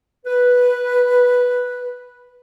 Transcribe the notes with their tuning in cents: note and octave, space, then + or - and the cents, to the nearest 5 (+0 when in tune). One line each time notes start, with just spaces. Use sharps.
B4 -5